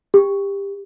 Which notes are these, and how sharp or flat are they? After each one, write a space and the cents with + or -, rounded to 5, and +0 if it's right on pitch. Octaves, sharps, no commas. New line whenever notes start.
G4 +20